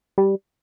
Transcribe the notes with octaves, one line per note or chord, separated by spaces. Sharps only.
G3